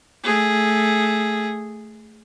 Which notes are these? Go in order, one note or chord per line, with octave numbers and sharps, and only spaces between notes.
A3 G#4